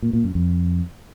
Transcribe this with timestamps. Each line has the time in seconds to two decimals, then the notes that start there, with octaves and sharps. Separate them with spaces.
0.02 A#2
0.13 A#2
0.24 F#2
0.35 F2